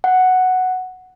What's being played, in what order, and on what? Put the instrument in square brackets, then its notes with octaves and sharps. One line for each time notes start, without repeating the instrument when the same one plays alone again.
[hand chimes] F#5